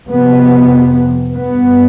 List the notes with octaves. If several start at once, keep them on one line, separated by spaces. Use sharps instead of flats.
F2 C3 B3
G2 B3